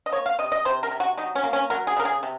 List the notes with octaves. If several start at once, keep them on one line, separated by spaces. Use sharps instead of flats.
D#5
A#3 C#5
F5
C3 D#5
D#5
C3 C5
A#4
C3
F#4
F#3 D#4
C#4
A#3
C#4
F#3 A#4
G#4
C#3 A#4
G#4
C3